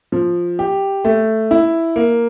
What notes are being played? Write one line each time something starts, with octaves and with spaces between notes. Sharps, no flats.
F3
G4
A3
E4
A#3